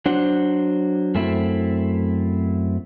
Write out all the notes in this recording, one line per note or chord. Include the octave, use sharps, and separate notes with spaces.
F#3 D4 C5 F#5
F#2 A3 C4 E4